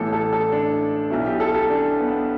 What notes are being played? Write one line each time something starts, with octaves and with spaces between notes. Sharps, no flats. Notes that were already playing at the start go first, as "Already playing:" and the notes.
Already playing: A1 A2 E3 A4
A4
A4
D4
B1 B2 E4
G4
A4
A4
D4
B3